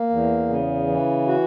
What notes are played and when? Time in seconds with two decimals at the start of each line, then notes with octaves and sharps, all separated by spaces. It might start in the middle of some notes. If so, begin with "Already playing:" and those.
Already playing: A#3
0.09 E2
0.49 C#3
0.87 E3
1.27 F#4